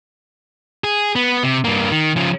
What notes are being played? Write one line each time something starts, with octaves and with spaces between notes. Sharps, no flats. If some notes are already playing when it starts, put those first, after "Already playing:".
G#4
B3
C3
G2 A#3
D#3
C#3 F3